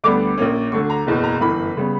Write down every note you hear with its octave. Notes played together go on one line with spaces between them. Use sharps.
D2 D3 G3 B3 D4 D6
A#1 A#2 A#3 C#4
D2 D3 F#3 C#6
A#5
F#1 E2 B2
A#5
G1 F#2 E3 B5
C#3 G3 B3